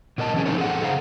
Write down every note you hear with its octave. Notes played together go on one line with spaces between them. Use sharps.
B2 A#4 D#5 A5
E3 C#4 G#4
D3 F3 C4 D#4 E4 C#5
G#4 A4 F#5 G5
C#3 G#4 C5 F5 A#5